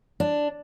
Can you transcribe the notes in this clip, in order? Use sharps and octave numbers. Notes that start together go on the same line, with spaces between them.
D4